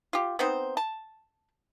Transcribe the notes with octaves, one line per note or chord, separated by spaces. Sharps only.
F4 G4
B3 C4 D#4 C5
A5